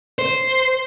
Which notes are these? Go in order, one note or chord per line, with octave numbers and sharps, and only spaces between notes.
C5